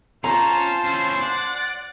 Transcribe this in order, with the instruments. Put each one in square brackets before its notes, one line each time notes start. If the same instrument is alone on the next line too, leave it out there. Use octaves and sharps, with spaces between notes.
[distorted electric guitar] C#4 [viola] F4 A5 [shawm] C5 [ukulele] A#5
[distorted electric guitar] C#4 E4
[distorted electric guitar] D5 [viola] F#5